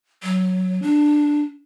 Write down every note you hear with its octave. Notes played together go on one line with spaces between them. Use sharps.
F#3
D4